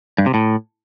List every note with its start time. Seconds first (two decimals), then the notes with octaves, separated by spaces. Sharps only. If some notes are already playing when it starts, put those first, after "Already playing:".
0.18 G2
0.26 C3
0.34 A2